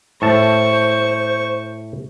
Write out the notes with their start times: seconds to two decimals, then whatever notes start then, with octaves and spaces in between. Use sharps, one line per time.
0.22 A2 C5 A5 C#6